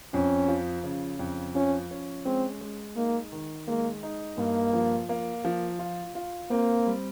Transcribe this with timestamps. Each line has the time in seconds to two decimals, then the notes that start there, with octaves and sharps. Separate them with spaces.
0.14 F2 C#4
0.48 F3
0.84 C#3
1.19 F2
1.55 F3 C#4
1.91 C#4
2.25 G#3 C4
2.61 G#3
2.96 A#3 D#4
3.32 D#3
3.68 G#3 A#3
4.03 D#4
4.38 G2 A#3
4.73 F3
5.09 A#3
5.45 F3
5.79 F4
6.15 F4
6.50 A#3 C4
6.87 G3